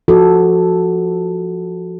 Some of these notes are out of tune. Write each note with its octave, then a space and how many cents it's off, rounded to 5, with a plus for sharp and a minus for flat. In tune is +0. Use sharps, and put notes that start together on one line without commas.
F3 -5 F#4 +0 A4 +0